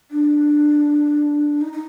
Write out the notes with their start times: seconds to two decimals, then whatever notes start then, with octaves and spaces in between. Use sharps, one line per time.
0.11 D4
1.61 D#4
1.73 D#4